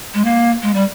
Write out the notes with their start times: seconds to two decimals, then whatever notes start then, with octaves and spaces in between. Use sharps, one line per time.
0.14 G#3
0.25 A#3
0.63 G#3
0.74 G3